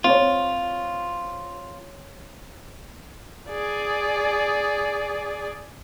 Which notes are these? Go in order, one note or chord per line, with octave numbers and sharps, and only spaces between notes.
C4 F4 C#5
G#4 D5